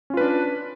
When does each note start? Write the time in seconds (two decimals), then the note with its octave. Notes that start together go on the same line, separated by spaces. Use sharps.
0.10 C#4
0.14 F4
0.17 B4
0.21 D4